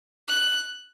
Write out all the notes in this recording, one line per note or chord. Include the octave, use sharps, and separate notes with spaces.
F#6